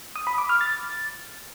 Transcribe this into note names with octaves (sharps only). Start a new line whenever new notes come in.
D#6
B5
D6
F6
A6